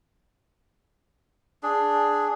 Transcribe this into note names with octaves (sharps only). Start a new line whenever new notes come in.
D4 G#4